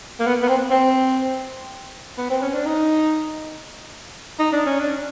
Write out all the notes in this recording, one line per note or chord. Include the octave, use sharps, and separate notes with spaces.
A#3
B3
B3
C4
C4
B3
C4
C#4
D4
D#4
D#4
D4
C#4
D4